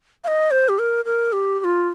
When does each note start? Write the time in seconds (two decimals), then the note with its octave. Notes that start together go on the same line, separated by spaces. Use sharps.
0.24 F5
0.28 D#5
0.51 C5
0.69 G4
0.79 A#4
1.05 A#4
1.33 G4
1.60 G4
1.64 F4